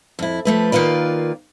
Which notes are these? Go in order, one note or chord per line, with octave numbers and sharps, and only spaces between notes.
F2 E4
F3 A3 B4
D#3 A#3 F4 B4 D5